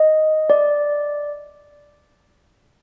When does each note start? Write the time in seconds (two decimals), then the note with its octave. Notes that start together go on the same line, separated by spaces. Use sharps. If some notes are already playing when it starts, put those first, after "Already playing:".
Already playing: D#5
0.50 D5